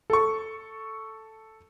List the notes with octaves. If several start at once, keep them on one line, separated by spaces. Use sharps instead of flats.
A4 C#6